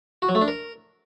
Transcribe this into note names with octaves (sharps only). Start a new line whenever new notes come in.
F#4
F#3
A3
D4
A#4